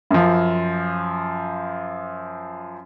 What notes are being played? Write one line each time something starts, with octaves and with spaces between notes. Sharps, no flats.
F#2 F3